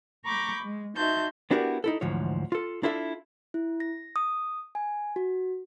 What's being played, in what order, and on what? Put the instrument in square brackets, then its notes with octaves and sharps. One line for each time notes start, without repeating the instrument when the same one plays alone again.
[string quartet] A#5 B5 C#6 D6 G6
G#3
D#4 F#4 E5 A5 C6 G6
[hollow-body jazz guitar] B3 D4 E4 F#4 G4 A#4
D#4 E4 A4
D2 G#2 E3 F3 C#5
F4 A4
D4 E4 F4 A4 E5
[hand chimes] E4
A#6
D#6
G#5
F#4